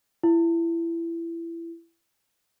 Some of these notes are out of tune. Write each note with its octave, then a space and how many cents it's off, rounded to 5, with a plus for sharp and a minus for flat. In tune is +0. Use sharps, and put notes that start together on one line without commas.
E4 +25